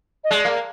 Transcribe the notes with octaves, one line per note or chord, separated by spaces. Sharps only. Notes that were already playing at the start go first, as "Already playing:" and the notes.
D#5
G#3 D5
A#3